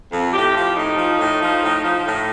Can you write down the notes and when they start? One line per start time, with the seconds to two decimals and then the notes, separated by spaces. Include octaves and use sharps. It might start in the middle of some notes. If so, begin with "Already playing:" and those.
0.12 F2
0.33 A2 G4
0.54 F3
0.77 A2 D#4
0.97 F3
1.19 A2
1.41 F3
1.63 A2
1.84 F3
2.05 A2